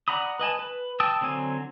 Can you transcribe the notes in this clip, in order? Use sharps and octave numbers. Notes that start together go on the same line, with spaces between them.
D5 F#5 A#5 B5 D#6
B4 D#5 G#5 A5
B4
G5 A5 D#6 E6
D3 F#3 C4 G#5